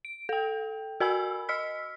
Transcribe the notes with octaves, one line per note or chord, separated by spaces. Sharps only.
D7
A4 G5
F#4 A#4 G#5 B5 E6
D#5 E6 F6 B6